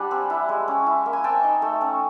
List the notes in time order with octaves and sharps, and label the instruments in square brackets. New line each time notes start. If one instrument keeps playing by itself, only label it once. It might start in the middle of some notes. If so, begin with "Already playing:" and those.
Already playing: [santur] G3 D4 F#5 G#5
C4
E4
G#3
C#4
E4
A#3
G#5
C4 G5 A5
D#4
A3
C#4